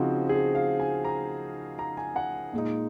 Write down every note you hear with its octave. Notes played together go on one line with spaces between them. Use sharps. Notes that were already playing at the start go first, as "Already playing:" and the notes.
Already playing: C#3 F3 C4 D#4 F#4
G#4
F5
G#5
A#5
A#5
G#5
F#5
A#2 G#3 D#4